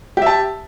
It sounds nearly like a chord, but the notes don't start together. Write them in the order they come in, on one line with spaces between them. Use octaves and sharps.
G4 E5 A5